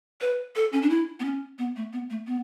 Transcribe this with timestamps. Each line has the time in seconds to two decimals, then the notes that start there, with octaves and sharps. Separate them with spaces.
0.21 B4
0.56 A4
0.73 C#4
0.82 D4
0.90 E4
1.20 B3
1.25 C#4
1.59 B3
1.76 A3
1.93 B3
2.10 A3
2.27 B3